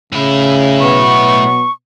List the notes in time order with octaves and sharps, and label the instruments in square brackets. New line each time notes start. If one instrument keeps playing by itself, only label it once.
[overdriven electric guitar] A2 E4 [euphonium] C#3
[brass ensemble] B2 F#3 B3 [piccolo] C#6